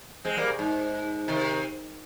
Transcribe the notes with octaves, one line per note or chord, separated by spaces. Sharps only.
G#3 C4
G3 A#3
C3
G#2
C3 D#3